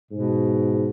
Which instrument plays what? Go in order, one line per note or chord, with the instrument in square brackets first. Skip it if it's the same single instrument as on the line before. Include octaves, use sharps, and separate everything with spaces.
[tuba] G#2 [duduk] B2